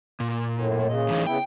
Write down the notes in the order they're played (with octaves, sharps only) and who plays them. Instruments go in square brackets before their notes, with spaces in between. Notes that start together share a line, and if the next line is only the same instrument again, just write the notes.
[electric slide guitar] A#2
[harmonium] F#2 A2
C#3 D#5
[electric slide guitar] A2 E3 D#4
[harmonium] C#3 B3 E4 [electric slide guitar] G5